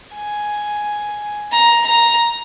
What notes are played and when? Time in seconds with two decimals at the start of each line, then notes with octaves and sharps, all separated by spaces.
0.14 G#5
1.52 A#5
1.86 A#5